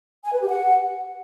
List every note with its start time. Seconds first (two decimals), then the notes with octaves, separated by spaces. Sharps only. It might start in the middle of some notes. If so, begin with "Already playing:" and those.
0.25 G#5
0.33 B4
0.41 G4
0.49 F#5